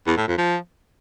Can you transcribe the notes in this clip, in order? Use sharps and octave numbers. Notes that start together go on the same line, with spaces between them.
E2
A2
F2
F3